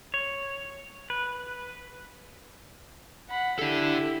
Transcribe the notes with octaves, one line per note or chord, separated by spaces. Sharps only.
C#5
B4
F#5 B5
D4 E4 G4 A4